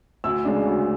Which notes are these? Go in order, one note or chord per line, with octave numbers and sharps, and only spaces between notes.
D2 E6
C#3 G#3 D4
D2